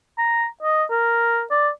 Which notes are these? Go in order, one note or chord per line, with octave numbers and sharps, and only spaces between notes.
A#5
D#5
A#4
D5